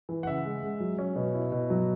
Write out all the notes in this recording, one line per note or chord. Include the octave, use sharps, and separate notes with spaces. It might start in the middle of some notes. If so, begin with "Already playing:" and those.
E3
F#5
C#3 E5
G#3
G#3
F#3
C#4
B2
E4
B2
F#3